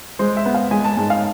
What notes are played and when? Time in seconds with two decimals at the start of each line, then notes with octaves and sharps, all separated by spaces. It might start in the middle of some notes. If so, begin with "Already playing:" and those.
0.19 G#3 C5
0.37 E5
0.45 B3
0.54 F5
0.71 G#3 G#5
0.84 A5
0.97 G#2 A5
1.10 F5